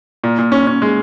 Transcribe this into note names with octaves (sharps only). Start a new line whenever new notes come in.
A#2
A#2
C#4
C#4
G#3